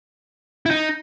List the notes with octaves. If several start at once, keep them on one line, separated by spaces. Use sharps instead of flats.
E4
D#4